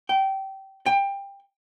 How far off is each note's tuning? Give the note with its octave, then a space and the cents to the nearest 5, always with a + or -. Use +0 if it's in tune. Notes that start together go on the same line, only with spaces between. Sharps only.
G5 -20
G5 +20